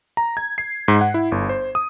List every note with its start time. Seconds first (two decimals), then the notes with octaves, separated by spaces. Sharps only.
0.17 A#5
0.37 G#6
0.58 C7
0.88 G#2
1.01 F#5
1.14 E4
1.32 G1
1.49 C5
1.75 D#6